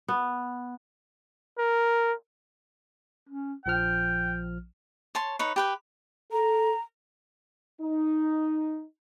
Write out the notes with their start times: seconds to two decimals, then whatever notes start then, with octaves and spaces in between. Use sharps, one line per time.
0.08 B3
1.59 A#4
3.29 C#4
3.66 A#1 F3 G5 F6
5.15 C#5 A5 C6
5.39 D#4 B4 C#5
5.56 G4 B4 G5
6.32 A4 A#5
7.82 D#4